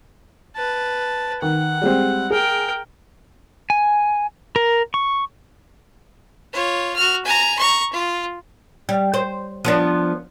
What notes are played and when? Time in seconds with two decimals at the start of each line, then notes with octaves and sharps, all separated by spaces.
0.56 B4 A5
1.42 D#3 F#5
1.82 G3 G#3 C4
2.31 G#4 A#4 G5
3.70 G#5
4.56 A#4
4.94 C#6
6.53 F4 C#5
6.96 F#4 F6
7.25 G#5 A#5
7.59 A#5 C#6
7.93 F4
8.89 G3
9.14 C5
9.65 F3 B3 D4